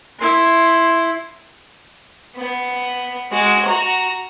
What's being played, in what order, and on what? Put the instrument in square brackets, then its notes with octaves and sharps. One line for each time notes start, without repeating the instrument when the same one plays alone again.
[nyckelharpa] E4 C6
[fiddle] B3
G#3 F#4
F#4 A#5